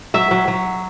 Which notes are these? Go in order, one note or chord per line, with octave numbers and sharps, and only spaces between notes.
F#3 E5
F#3
F#3